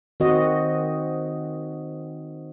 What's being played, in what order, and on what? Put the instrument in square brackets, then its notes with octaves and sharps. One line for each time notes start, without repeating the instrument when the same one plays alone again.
[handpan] D#3 C4 F#4 D#5